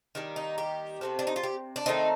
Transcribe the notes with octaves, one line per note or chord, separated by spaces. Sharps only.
D#3 G3 A#3
D#4
G4
C3 F3 A3 C4
D4
D#4
F4
G4
D4
D#3 A3 C4 D#4